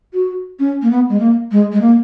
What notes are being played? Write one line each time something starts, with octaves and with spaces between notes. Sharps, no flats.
F#4
C#4
A#3
B3
G#3
A#3
G#3
G#3
A#3